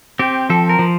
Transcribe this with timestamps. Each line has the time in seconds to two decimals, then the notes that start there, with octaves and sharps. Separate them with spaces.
0.19 C4 G4
0.50 F3 A4
0.69 A#4
0.79 F3